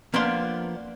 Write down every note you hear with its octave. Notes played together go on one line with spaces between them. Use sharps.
F3 A#3 B3 D4 F5 C6